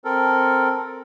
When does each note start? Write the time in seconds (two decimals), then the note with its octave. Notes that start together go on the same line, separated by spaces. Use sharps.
0.05 C4 A4 A#4